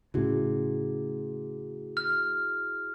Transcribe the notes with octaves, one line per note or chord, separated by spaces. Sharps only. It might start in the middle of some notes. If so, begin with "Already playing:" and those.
A2 C#3 E4 F#4 G#4
F6